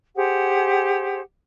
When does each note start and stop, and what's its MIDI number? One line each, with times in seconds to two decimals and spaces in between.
0.15 1.20 67
0.15 1.20 68
0.15 1.20 72
0.15 1.20 78